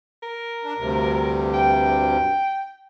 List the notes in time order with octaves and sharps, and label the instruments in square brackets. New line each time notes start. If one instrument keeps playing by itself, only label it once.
[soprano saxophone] A#4
[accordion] D4
D2 G2 C3
[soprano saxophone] G5